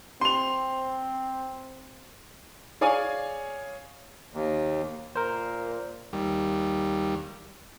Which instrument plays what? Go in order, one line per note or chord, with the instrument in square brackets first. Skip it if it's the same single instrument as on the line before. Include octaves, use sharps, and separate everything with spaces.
[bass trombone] C4 [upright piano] C6 F7
[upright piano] G#4 C#5 D5 F5 G#5
[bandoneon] D#2
[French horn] A#2 [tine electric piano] A#4 C5
[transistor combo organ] D#2 G3